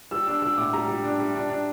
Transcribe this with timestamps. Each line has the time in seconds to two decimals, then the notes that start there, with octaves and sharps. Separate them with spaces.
0.11 G3 E6
0.27 D4 E6
0.42 G3 E6
0.57 A2 D6
0.73 G3 A#5
0.88 G3
1.04 D4
1.19 G3
1.35 D4
1.50 D4